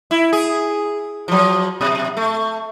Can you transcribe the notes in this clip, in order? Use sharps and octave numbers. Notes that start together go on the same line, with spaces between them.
E4
G#4
F3 F#3
B2
A3